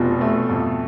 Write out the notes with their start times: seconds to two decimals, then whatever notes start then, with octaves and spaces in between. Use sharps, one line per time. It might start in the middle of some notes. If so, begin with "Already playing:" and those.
Already playing: F1 B2 F3
0.21 A3
0.50 F2